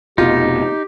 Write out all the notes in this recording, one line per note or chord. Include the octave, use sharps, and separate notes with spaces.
F1 B2 D#4 F4 G4